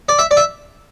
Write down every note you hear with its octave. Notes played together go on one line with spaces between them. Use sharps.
D5
E5
D5
E5